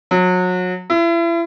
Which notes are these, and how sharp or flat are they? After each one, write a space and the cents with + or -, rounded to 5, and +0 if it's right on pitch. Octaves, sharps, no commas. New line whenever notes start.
F#3 -30
E4 +35